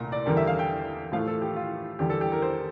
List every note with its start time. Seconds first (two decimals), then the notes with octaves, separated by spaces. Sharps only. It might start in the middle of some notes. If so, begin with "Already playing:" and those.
Already playing: C2 A#2 A3 A#5
0.12 D5
0.26 E2 D3 G3 A#4
0.37 E5
0.47 F5
0.59 G5
1.12 A2 F3 A3 F5
1.27 A4
1.42 G4
1.56 F4
1.99 E2 D3 G3 G4
2.10 A4
2.21 G4
2.32 A#4
2.42 C5